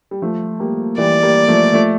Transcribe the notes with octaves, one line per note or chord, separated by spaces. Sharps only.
G3
F3 A3
G3 A#3
E3 G3 D5
G3 A#3
F3 A3
F3 A3